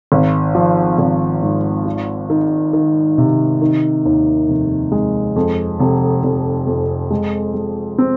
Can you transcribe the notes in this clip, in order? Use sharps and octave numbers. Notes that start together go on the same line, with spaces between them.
G#1
F3
G#1
G#2
F4
D#3
D#3
C3
D#3
D#2
F1
G#3
F2
F1
F1
F2
G#3
G#3
C4